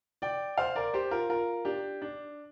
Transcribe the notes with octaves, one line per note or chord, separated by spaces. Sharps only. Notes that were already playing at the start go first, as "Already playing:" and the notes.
D5 G5
C5 F5
A#4 D5
G4 C5
F4 A#4
F4 A#4
D4 G4
D4